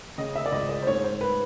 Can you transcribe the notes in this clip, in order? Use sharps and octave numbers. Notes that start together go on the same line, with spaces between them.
C#3 D#5
E5
D5
C#2 D#5
D5
C5
G#2 C#5
C5
B4